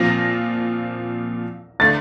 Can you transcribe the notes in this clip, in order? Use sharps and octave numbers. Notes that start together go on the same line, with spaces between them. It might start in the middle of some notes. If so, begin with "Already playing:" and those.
Already playing: A#2 F3 C4 F4 A#6
D3 A3 A6